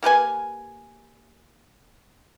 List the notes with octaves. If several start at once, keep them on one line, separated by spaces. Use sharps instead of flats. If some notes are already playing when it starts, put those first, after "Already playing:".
A#3 G4 B4 G#5